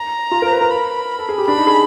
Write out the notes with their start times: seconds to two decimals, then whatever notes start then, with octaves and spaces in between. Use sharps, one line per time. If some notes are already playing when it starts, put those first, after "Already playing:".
Already playing: A#5
0.31 F4
0.42 A#4 C5
0.51 B4
0.61 A#4
0.71 B5
1.19 A4
1.29 G#4
1.38 G4
1.48 D4 B5
1.57 D#4
1.67 G#4